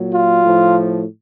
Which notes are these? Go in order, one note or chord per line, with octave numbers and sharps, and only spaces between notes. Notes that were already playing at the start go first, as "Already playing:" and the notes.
Already playing: A#2 F#3
F4
A2 F3